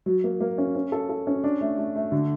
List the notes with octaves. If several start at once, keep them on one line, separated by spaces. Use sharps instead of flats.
F#3
A#3
A#3
C#4
C#4
A4
A4
C#4
D4
A3
A3
A3
D3